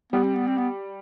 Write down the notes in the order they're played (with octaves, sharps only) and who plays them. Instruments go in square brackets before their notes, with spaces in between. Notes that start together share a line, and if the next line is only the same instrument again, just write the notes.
[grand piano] G3 [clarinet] B3
[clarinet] C4
B3
C4
B3